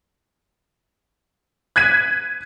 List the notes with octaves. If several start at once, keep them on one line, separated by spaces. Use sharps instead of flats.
F#6 G#6 B6 D#7